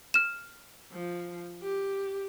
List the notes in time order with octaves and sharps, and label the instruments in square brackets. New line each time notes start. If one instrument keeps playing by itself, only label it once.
[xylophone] F6 E7
[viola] F3
G4